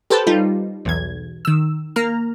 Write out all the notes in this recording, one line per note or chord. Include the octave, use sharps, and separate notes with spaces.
G4 A4 B4 C5 G5 A5
G3 D#4 F4
B1 E2 G#6
D#3 E6
A#3 A#5 F6